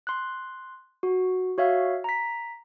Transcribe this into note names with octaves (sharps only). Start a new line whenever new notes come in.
C6 F#6
F#4
F#4 C#5 E5 F5
A#5 B6